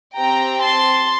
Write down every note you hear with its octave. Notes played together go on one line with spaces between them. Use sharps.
C4 G4 G5 A#5
A5 C6